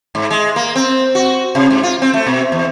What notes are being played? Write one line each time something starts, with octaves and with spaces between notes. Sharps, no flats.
G#2
G#3
A#3
C4
F#4
C3
G#2
F4
C4
A3
B2
E2